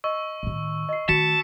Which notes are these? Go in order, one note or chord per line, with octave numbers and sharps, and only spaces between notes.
D#5 C#6 E6
A2 D#3
D#5 C7
D#3 A3 F#4 A5 B6 C#7